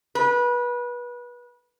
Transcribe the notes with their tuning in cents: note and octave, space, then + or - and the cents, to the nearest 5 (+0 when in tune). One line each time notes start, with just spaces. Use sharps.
B4 -25